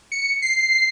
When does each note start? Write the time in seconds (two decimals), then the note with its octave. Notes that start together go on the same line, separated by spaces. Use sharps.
0.12 C#7
0.42 C7